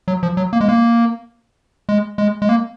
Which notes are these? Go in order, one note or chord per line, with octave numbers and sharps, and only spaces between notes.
F#3
F3
F#3
A#3
G#3
A#3
G#3
G#3
G#3
A#3